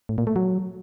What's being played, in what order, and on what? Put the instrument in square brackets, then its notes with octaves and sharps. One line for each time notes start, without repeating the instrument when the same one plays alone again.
[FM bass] A2
A#2
A3
F#3